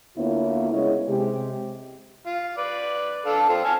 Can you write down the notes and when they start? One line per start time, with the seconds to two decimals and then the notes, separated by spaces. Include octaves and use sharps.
0.17 D2 A#3 B3 E4 F4 C#5
0.72 C#3 G#3 B3 E4 C#5 D#5
1.08 C3 G#3 G4
2.26 F4
2.58 B4 D5
3.26 D4 A4 F5
3.49 C4 F4
3.65 G#5 A5 F6